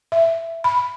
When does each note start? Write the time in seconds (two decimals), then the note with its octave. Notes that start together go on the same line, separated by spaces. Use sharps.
0.12 E5
0.64 B5